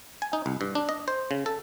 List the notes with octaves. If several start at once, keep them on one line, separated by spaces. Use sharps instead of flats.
G#5
D#4
C2
G2
D4
D#5
C5
C#3
A4